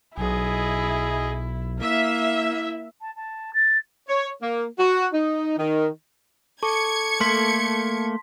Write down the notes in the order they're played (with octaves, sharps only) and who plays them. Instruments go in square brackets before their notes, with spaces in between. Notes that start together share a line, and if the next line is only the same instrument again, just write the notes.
[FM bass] B1 [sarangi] E4 [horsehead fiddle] G#4 D#5
[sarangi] A#3 [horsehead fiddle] E4 [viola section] E5
[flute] A5
A5
A6
[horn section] C#5
A#3
F#4
D#4
D#3
[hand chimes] A4 C#6 D6 [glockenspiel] A5 [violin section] G#6 C#7
[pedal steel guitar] A3 A#3 [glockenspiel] C6 B6